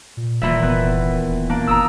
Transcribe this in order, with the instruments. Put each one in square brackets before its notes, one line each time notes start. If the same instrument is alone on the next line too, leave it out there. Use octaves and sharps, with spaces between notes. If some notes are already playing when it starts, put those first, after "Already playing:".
[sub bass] A#2
[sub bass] D1 [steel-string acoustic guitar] D#2 A#2 E3 [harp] E5 B5
[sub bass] F1 [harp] B3
[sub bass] D#1
[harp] A#3 D4
[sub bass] F#1 [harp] A#5 D#6 E6